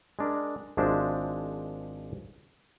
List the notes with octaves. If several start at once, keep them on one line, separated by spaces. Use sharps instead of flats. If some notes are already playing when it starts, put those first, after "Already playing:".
G#3 D4 A#4
G#1 F3 G#3 D4 C5 E5